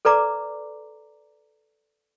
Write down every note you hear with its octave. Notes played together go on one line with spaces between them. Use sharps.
A4 B4 D5 A#5 D6